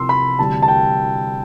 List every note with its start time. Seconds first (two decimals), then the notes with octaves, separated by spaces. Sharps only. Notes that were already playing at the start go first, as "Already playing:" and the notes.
Already playing: C2 C3 F3 C6 E6
0.09 B5
0.39 D2 C3 E3 G3 A5
0.63 A5
0.68 G5